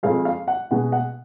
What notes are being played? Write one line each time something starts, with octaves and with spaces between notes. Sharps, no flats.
F2 F3 G#3 F5
F5
F#5
B2 G#3 F#5
F#5